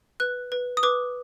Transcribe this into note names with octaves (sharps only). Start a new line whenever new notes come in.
B4 F#6
B4
D#6
B4 D6